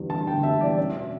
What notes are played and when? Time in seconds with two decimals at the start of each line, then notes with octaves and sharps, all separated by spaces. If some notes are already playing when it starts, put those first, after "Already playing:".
Already playing: E2 D3 G3
0.10 D4 A5
0.27 D3 G5
0.43 G3 E5
0.61 E2 D5
0.78 C#4 E5
0.94 B2